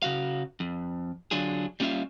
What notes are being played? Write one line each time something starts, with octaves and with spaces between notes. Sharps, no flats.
C#3 F#4 F5
F2
D3 F#3 D4 F4 G#4
G3 A#3 C#4 F4 E5 F5